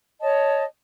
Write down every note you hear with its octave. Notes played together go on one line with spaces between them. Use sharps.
C#5 D#5 A5